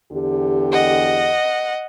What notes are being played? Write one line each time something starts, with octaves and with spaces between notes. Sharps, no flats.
E2 D3 G4
D#5 F#5